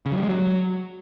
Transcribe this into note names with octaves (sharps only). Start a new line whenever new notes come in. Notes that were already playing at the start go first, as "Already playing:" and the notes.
C#3
F#3
G3
G#3
F#3